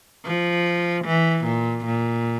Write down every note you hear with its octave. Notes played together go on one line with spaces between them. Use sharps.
F3
E3
A#2
A#2